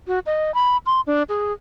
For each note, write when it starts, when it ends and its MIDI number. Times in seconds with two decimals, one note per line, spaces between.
0.08 0.19 66
0.26 0.54 75
0.54 0.77 83
0.86 1.01 84
1.07 1.23 62
1.29 1.53 68